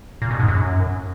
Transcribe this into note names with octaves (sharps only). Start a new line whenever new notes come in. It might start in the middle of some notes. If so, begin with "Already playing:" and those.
A#2
B2
G#2
F#2